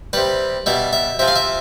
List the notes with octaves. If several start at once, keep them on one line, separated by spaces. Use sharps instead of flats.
C3 G3 B4
B2 G3 E5
E5
C3 F3 E5
F5
E5